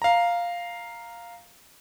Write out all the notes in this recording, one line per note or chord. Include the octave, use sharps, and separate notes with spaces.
F5 A#5